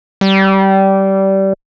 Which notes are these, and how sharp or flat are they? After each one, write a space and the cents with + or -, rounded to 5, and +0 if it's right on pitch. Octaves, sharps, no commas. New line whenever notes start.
G3 -20